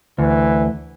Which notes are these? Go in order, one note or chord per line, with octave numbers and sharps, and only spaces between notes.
D2 E3